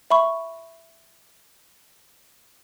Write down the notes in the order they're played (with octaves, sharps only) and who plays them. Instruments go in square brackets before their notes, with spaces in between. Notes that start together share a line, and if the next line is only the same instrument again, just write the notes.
[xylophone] E5 B5 C#6